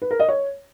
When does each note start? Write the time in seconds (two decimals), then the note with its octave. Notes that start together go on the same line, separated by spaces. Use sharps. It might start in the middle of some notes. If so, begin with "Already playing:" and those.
0.02 B4
0.11 A#4
0.20 D#5
0.29 C#5